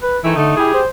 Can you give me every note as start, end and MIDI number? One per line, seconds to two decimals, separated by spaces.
0.03 0.19 71
0.24 0.35 51
0.24 0.33 52
0.24 0.35 57
0.24 0.35 64
0.36 0.57 50
0.36 0.54 57
0.36 0.54 63
0.57 0.80 55
0.57 0.71 64
0.57 0.80 67
0.57 0.80 68
0.74 0.88 72